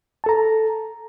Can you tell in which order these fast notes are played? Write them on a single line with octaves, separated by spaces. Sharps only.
A5 A4 A#5